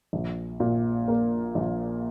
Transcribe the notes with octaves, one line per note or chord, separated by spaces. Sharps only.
A#1
A#2
A#3
A#1